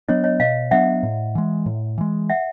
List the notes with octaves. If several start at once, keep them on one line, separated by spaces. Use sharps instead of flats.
F#3 B3 D4 C#5 D#5
C#5 D#5
B2 D#5 F5
F#3 B3 D4 E5 F#5
A2
E3 G#3
A2
E3 G#3
E5 F#5